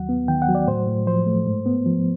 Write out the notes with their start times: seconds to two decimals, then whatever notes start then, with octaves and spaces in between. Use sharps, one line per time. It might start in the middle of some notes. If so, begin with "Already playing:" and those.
Already playing: D#2 F#3 F#5
0.09 B3
0.28 D#3 G5
0.42 F#5
0.48 F#3
0.55 D5
0.67 A2 C5
0.87 A2
1.06 F3 C5
1.26 A3
1.46 G#2
1.66 B3
1.86 F3